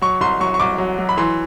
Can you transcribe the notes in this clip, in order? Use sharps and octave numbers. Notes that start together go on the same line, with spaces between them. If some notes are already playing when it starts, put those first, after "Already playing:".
F#3 C#6
C2 C6
F#3 C#6
C#6
C2 D6
F#3
F#3
B5
E3 C6